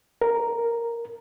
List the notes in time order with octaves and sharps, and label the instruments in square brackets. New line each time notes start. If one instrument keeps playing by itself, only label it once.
[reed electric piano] A#4